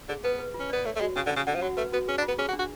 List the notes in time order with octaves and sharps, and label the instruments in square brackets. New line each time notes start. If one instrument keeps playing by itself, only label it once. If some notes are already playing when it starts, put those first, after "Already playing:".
[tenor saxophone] D3 [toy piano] G#4
[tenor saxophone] B3 [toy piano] B4
[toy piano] B4
F4
[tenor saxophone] C#4
[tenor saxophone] B3 [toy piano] D5
[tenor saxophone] A3 [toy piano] C#5
[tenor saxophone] A3
[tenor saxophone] G#3 [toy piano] F#4
[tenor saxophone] C#3 [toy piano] C#4
[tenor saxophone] D3
[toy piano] C#4
[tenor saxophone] C#3
[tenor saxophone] D3 [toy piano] F#5
[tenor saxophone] F3
[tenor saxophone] F#3 [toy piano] F#4
[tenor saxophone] A3 [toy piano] B4
[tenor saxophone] B3 [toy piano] F#4
[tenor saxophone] C#4 [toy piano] G#4
[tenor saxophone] D4
[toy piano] F4
[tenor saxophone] B3
[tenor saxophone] C#4 [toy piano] G#4
[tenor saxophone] F#4
[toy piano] D4
[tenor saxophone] F#4